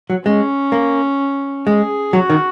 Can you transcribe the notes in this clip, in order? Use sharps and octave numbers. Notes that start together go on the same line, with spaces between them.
F#3
G#3 C#4
A#3
G#3 G#4
F#3 F#4
D#3